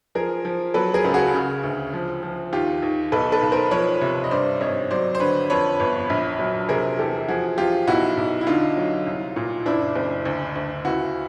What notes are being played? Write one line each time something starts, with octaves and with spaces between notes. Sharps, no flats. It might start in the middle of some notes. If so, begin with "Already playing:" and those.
F3 G#4 A#4
F3
F#3 A4 B4
G#4 A#4
C#2
F#4 G#4
C#3
D2
F3
F3
D#2 F4 G4
D#2
B1 A4 B4
A4 B4
B1
A#4 C5
F3 B4 C#5
C3
D#5
G2 C5 D5
G#1 C#5 D#5
F#3 C5 D5
C5
D3 B4 C#5
F2 B4 C#5
G1
A#1
F#3
C3 G#4 A#4
E2 G4 A4
F3 F#4 G#4
F3 F4 G4
B1 E4 F#4
B1
E4
D3 D#4 F4
F#3
C2
A#2
F#1 D4 E4
F#1
D2
D2
C#2 E4 F#4